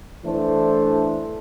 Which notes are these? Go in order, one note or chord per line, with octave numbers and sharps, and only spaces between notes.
E3 A3 D4 A4 C5